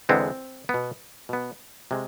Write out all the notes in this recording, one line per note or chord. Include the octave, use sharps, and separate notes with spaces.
E2 D3 G#3 B3 C4
B3
B2
B2 B3
C3 G#3